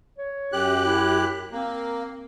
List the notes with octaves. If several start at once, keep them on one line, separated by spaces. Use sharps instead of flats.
C#5
F#2 G4 F#6
E4
A#3 C4